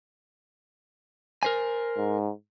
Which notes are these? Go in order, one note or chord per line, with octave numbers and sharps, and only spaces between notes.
A#4 C5 G#5
G#2